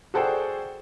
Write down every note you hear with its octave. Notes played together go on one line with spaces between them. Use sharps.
F#4 G#4 A4 C5 D5 G5